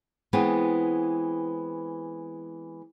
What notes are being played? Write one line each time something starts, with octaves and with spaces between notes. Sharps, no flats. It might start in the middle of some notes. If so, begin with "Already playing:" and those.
E3 G#3 B3 C4